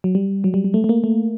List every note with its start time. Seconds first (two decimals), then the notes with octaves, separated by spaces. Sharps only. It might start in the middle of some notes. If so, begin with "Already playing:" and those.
0.04 F#3
0.15 G3
0.44 F#3
0.54 G3
0.64 G3
0.74 A3
0.84 A3
0.89 A#3
1.04 A3